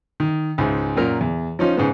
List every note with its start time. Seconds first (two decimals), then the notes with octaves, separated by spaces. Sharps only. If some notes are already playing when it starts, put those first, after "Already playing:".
0.20 D#3
0.58 C#2 G#2
0.97 F#2 A#2 A#4
1.21 E2
1.59 F3 C#4 D#4 F4
1.77 G#2 C#3 B3